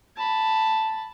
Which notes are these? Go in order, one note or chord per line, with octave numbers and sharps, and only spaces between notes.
A5 B5